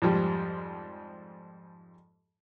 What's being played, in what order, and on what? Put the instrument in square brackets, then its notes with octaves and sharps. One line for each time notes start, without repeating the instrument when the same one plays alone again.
[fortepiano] F2 G#2 F3 G3